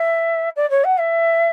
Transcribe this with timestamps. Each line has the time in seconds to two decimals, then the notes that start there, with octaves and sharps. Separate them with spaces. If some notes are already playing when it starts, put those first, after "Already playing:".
Already playing: E5
0.56 D5
0.70 C#5
0.84 F#5
0.98 E5